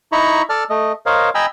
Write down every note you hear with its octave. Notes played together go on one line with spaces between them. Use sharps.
D#4 E4 A#5 B5 C#6
A4 D5 A5 F6
A3 D#5
A#4 C5 C#5 D#5 F5
D#5 G5 G#5 A#5 B5 E6